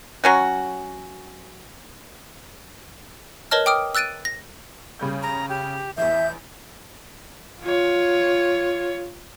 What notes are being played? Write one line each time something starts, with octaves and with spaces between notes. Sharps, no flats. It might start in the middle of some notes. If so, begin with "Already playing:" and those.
F#3 C#4 F#4
A#4 B4 C#5 D#5 A5 F6
G5 D6 D#6 F6 D7
E6 F#6 A6 D7 D#7
A#6
C#3 G3 G6
A#5
G4
A1 E2 E5 G6
F4 C#5